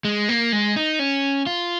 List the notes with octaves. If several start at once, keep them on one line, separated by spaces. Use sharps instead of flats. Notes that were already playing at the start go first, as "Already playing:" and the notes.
G#3
A#3
G#3
D#4
C#4
F4